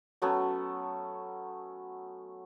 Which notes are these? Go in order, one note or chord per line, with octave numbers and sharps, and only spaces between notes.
F#3 A3 B3 C#4